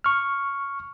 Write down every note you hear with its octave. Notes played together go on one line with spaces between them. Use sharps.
C#6 F6